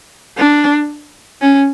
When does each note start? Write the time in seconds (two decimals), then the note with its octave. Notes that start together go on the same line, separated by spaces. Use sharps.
0.37 D4
1.42 C#4